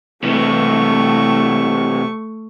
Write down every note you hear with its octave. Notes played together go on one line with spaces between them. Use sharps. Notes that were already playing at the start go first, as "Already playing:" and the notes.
C3 E3 A3 C#6